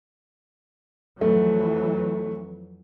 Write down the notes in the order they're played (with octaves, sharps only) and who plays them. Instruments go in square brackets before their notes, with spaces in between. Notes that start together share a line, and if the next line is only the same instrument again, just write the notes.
[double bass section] F2 E3 F#3 [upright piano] A3